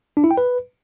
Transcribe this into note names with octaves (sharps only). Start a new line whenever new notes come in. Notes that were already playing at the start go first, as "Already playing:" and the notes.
D4
E4
G5
B4